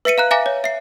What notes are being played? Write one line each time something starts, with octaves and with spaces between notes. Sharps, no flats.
B4 E5 B6 C#7 D#7
F5 A#5 F#6
E5 F5 G#5 A#5 D6 A#6
C#5
E5 C7